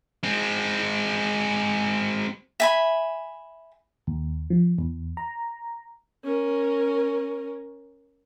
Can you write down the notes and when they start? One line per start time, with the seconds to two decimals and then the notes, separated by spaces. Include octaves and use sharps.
0.23 G#3 C4
2.60 E5 G#5 B5
4.07 D#2
4.50 F3
4.78 E2
5.17 A#5
6.25 C#4 A#4